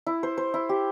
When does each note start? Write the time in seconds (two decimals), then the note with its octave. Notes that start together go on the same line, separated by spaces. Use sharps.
0.07 E4
0.23 C5
0.37 C5
0.54 E4
0.69 G4